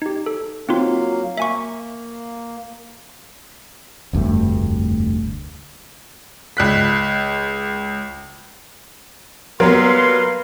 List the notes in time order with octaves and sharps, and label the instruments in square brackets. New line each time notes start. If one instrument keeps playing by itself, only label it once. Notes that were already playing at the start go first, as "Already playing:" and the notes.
[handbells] D#4 G4
A4
[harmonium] F#3 A#3 F5 [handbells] C4 D#4 F4
[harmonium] A#3 [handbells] E5 G#5 C#6
[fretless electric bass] F1 D2 G2 A3
[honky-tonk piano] C#2 F#6 B6
[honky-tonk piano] F#3 G3 B3 [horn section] A#3 B4 C6 [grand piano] A#4